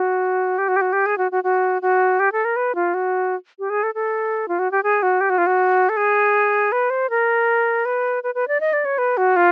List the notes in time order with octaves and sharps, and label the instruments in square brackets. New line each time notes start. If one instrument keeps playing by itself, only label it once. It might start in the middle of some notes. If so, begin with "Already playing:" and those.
Already playing: [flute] F#4
G4
F#4
G4
F#4
G4
G#4
F#4
F#4
F#4
F#4
G4
A4
A#4
B4
F4
F#4
G4
G#4
A4
A4
F4
F#4
G4
G#4
F#4
G4
F#4
F4
F#4
A4
G#4
B4
C5
A#4
B4
B4
B4
D5
D#5
D5
C#5
B4
F#4
F4